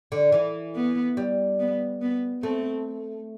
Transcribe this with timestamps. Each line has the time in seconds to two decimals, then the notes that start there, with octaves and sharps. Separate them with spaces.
0.12 D3
0.32 E3
0.75 B3
1.17 G3
1.59 B3
2.01 B3
2.43 A3 C4